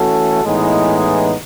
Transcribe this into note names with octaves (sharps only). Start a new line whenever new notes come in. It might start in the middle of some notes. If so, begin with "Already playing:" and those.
Already playing: E3 A3 C#4 F#4 A4
A2 E3 G#3 B3 D#4